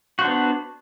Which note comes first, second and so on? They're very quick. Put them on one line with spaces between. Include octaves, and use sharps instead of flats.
F#4 C5 D4 B3